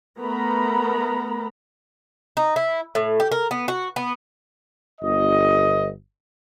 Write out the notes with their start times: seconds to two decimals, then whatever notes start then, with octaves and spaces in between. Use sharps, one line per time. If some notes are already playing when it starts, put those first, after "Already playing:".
0.19 A3 B3 A#4 A#5 B5
2.37 D#4
2.56 E4
2.95 A2
3.20 G4
3.32 A#4
3.51 B3
3.68 F#4
3.96 B3
5.01 G1 D#5